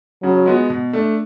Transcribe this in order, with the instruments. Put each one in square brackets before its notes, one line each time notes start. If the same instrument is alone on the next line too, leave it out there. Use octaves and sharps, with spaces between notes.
[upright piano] C#3 [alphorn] F#3
[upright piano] G#3 B3 F#4
B2
A3 D4